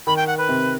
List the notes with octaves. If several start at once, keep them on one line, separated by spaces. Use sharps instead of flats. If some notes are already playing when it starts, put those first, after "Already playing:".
D#3 B5
G5
F#5
B4
C3